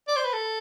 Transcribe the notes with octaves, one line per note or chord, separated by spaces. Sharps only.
D5
C5
B4
A4